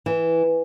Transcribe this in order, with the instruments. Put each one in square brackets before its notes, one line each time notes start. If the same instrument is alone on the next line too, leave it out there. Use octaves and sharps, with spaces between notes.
[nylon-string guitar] E3